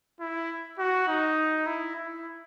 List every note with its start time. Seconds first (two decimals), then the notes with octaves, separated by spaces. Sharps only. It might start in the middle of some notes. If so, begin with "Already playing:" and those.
0.20 E4
0.79 F#4
1.08 D#4
1.66 E4
1.96 E4